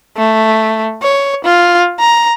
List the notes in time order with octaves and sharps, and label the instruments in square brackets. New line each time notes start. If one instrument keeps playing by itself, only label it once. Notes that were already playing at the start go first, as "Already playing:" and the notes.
[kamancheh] A3
C#5
F4
A#5